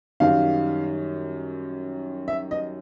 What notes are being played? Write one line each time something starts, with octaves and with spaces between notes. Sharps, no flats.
F#2 D#3 G3 F5
E5
D#5